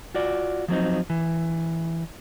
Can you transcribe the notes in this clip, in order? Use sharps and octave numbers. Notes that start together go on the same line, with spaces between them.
F4 F#4 D5
F3 F#3 C4 D#4
E3